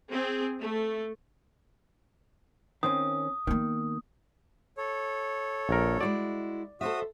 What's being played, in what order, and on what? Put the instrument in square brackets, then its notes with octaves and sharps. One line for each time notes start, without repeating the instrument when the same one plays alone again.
[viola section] C4 G#4
A3
[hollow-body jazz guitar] D#3 C4 C#4 [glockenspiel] D#6
[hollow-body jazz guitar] D#3 [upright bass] A#3 B3
[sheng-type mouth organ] A4 C#5
[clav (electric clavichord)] A#1 A#4
[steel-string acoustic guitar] G#3 E4 F#4 [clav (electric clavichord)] D5
[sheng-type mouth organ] F#4 D#6 [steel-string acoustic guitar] A4 C5 E5